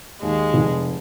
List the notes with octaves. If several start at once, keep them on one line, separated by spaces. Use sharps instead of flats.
D#2 G#3
F1